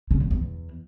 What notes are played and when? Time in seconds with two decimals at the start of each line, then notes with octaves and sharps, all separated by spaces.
0.11 C#3
0.21 F#2
0.31 E2